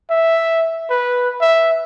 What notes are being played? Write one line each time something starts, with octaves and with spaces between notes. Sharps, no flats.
E5
B4
E5